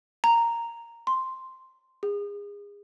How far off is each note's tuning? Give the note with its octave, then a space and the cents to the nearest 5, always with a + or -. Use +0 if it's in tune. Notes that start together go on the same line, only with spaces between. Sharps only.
A#5 -5
C6 +0
G#4 -30